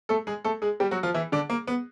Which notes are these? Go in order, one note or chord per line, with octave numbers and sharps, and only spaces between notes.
A3 A4
G#3 G#4
A3 A4
G#3 G#4
G3 G4
F#3 F#4
F3 F4
E3 E4
D3 D4
A#3
B3